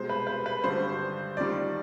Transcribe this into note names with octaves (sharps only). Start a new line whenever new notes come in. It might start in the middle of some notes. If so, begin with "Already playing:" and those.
Already playing: C2 B2 G#3 C5
B4
B4
B4
G#1 G2 D3 G3 C5
F2 D#3 G3 D5